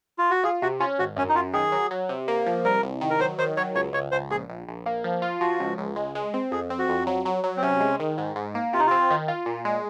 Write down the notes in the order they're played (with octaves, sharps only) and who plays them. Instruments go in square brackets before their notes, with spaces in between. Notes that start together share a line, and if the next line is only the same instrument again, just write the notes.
[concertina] F4
F#4
[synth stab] F4 [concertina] G#4
[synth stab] C3 [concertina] F#4
[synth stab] C#4 [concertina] F4
[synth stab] G#1 [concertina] F#4
[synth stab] F#2 [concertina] C#4
[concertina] D#4
[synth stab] F#2 [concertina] F4
[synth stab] D#3 [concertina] G#4
[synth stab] F#3
F#3
C3
A#3
F3
[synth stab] C2 [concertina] A#4
[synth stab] C2
D#3
[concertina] A#4
[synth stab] F#3 [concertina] C5
[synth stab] D#3 [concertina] C5
[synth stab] F#3 [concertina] C#5
[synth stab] C#2 [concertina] C#5
[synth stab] C#2 [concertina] C#5
[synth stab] C#2 [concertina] C5
[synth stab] A#1 [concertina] G#4
[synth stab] A#1
A#1
A#3
F3
F4
[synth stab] F3 [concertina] F#4
[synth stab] C#2
C#2
G#3
G#3
C4
[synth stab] F2 [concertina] G#4
[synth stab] C4
[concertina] F#4
[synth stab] F2
F#3
F#3
F#3
[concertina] C4
[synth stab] C3 [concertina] C#4
[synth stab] G#3
D#3
G#2
G#2
A#3
[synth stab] C3 [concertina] F4
[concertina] D#4
[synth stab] C4 [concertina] F4
[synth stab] D#3
F4
A#2
G#3